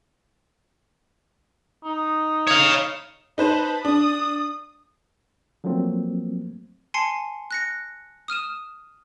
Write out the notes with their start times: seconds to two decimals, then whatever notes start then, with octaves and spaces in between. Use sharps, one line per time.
1.84 D#4
2.47 C#5 F5
3.38 D#4 B4 C5 A5 B5
3.85 D4 D#6
5.64 F3 F#3 A3 A#3 C4
6.94 G#5 A5 C6 C7 C#7
7.51 F#6 A#6 C#7
8.28 D#6 F6 D#7 E7